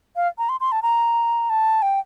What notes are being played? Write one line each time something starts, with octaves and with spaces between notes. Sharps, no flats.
F5
A#5
C6
C6
A5
A#5
A5
G5